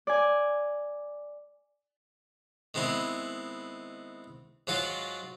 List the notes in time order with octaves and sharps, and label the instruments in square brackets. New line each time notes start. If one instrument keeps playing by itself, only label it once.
[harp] D5 G#5
[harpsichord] D#3 G#3 B3 C4 E4
G#2 F#3 F4 F#4 A5